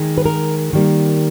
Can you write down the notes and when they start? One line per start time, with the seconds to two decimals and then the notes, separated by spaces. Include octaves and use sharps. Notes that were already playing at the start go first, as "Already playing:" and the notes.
Already playing: D#3 G#3
0.18 B4
0.26 A#4
0.73 D#3 G3 A#3